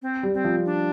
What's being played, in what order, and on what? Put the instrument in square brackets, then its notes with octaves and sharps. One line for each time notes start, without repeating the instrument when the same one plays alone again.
[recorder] C4
[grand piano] G3
[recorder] C4
[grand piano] F3
[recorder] D4